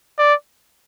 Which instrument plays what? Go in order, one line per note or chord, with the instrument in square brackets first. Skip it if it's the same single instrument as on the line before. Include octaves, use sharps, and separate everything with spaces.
[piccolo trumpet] D5